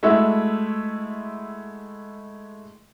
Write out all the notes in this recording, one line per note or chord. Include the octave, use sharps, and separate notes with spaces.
G#3 A3 E4 F#4 E5